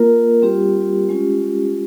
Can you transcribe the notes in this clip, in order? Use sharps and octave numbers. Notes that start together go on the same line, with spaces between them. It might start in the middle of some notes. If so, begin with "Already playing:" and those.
Already playing: A#3 F4 A#4
G3 C4 F4 G4
G#3 C#4 F4